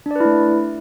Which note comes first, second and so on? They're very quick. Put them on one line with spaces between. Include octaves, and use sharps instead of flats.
D4 D5 B4 E4 A3